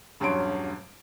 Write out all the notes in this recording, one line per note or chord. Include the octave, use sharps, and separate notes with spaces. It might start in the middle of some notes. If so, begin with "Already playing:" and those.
E1 G2 F#3 C#4 C6 D7